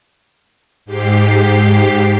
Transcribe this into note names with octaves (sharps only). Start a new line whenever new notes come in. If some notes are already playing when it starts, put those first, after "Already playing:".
G#2 G4 C7